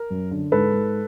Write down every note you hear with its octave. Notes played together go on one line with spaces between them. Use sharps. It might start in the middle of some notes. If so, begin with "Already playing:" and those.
Already playing: A#4
F#2
D3
G#2 A4 B4
G#2